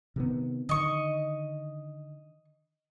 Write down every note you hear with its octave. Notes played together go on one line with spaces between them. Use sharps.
C3 D#3 B3
D3 D#3 D#5 C#6